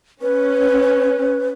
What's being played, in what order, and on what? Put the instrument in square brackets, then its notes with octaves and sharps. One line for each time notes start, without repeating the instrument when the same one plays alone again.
[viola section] C#4 [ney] B4